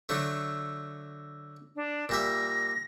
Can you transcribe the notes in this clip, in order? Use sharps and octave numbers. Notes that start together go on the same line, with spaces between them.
D3 F#3 A3
D4
A#2 G3 E5 A#6